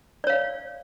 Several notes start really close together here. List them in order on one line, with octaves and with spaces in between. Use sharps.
D5 C#5 F5